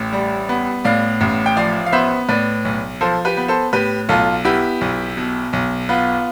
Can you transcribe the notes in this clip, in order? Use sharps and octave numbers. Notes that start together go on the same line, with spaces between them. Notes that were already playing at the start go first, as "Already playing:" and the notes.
Already playing: A1 A2
G3
B3
A2 D5 F5
A1
G5
F3 D5 F5
F5
B3 C5 E5
A2 B4 D5
B1
F3 A4 C5
G4 B4
B3
A4 C5
A2 G4 B4
B1 F4 A4
B3 E4 G4
B1
B2
B1
B3 F4